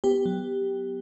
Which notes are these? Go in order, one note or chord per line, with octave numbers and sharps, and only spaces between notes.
B3 G4
F#3